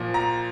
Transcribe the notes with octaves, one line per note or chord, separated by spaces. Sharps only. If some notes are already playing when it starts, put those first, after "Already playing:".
Already playing: A#2 F3
A#5